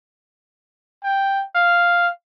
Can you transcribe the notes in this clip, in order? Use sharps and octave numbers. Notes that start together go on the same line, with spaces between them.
G5
F5